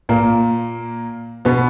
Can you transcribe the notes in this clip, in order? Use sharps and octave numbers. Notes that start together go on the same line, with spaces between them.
A#2 A#3
B2 B3